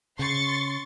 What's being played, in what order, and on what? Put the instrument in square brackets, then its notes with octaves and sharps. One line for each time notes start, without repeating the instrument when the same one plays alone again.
[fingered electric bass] C#3 [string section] C6 C#6 A6